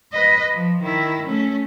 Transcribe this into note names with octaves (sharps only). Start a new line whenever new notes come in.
B4 D#5
F3
D#3 E4
A3 C#4